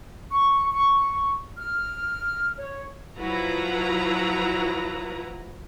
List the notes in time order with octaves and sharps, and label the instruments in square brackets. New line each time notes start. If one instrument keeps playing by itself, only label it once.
[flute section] C#6
C#6
F6
C#5
[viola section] F3 F#3 E4 F#4 B4 A#5